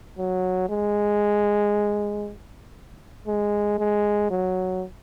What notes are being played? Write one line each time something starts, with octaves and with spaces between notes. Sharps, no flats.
F#3
G#3
G#3
G#3
F#3